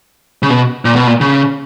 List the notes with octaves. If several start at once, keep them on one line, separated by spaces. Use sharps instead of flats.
C#3
B2
A#2
B2
A#2
C#3